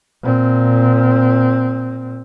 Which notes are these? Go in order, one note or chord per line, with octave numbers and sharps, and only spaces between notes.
A#2 C4